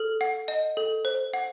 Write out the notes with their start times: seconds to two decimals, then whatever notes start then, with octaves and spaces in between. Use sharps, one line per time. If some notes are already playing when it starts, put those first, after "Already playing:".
Already playing: A4 F6
0.21 F#5
0.48 D#5
0.77 A4
1.05 C5
1.34 F#5